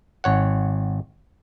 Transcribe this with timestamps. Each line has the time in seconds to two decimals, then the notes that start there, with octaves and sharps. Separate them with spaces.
0.24 G#1 C#5 F#5